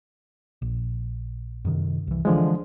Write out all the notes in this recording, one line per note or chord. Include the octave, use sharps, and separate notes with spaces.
A#1
F#2 C3 D#3
C2 E3
D3 E3 F3 G#3